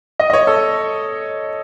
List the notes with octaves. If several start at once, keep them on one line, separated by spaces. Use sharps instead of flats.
D#5
D#5
C#5
A4